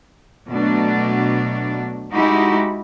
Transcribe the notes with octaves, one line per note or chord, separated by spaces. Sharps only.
B2 F#3 A3 D4
G#3 D#4 E4 F#4 G4